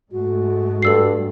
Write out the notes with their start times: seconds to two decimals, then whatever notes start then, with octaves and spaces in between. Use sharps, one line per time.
0.12 G#2 G#3 A3 F#4
0.82 G2 A4 E6 C7